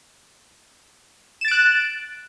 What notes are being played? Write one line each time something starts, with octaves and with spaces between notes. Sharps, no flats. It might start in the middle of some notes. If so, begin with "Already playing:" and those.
F#6 A6 D7 E7